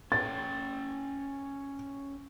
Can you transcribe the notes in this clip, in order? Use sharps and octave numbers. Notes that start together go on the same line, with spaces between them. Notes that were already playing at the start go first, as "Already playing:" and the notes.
C#4 C#5 G5 A6